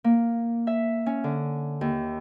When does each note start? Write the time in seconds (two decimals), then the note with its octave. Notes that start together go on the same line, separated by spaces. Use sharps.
0.04 A#3
0.67 E5
1.06 C#4
1.24 D3
1.81 D#2